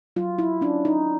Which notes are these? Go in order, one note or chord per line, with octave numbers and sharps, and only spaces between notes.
F#3 F4
E4
C#4 D4
D#4